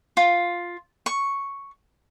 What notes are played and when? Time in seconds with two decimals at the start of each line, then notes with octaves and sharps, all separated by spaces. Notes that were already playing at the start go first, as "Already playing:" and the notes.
0.17 F4
1.06 C#6